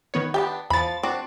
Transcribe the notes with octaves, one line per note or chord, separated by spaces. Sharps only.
D#3 B3 C#5
B3 D4 G4 G5
E2 F3 B5 A6
C4 D4 F#4